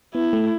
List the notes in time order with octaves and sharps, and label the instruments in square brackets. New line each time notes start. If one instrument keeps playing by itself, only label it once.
[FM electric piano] B3 [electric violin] E4
[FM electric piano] A3